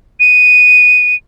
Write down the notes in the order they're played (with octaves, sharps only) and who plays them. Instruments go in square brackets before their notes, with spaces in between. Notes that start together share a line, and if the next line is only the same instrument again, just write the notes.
[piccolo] D#7